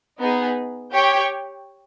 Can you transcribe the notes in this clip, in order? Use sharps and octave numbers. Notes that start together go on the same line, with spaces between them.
B3 D#4 G#4
G4 C#5 G5